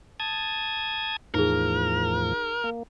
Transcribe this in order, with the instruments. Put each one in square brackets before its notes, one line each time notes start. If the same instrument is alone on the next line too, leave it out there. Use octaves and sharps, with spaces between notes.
[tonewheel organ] A5 D#6 G#6
[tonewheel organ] E2 A2 F3 [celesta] D#4 G#4 [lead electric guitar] A#4
[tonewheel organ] A#3